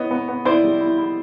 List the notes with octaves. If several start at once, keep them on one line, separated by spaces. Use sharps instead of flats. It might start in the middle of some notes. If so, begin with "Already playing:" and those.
Already playing: B3 E4 C#5 D#5
B3
B3
E4 C5 D5
G3
E4
E4